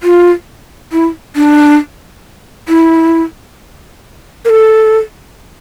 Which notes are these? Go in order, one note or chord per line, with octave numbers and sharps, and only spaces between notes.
F4
E4
D4
E4
A#4
A4